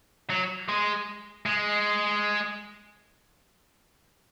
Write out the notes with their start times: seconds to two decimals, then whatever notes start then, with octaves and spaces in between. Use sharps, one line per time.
0.30 F#3
0.69 G#3
1.46 G#3